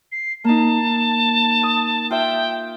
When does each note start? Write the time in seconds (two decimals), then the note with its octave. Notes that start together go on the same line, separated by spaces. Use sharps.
0.12 C7
0.44 A#3 D#4 A5
1.63 D#6
2.10 F4 E5 G5